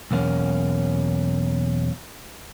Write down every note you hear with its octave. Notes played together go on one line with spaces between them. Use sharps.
B1 E2 A#3 C#4